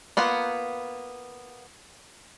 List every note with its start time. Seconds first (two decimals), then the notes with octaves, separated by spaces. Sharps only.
0.17 A#3 B3 F4 F#5